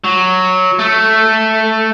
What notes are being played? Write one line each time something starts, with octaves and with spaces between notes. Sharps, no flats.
F#3
A3